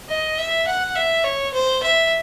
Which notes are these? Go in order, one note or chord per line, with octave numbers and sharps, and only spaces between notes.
D#5
E5
F#5
E5
C#5
C5
E5